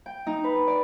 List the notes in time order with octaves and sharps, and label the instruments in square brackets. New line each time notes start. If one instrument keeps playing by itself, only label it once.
[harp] G5
D#4
B4
D5